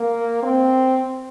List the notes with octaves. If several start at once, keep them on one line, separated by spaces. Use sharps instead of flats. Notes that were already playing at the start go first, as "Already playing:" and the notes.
Already playing: A#3
C4